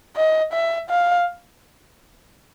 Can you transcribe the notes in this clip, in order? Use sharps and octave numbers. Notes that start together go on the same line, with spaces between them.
D#5
E5
F5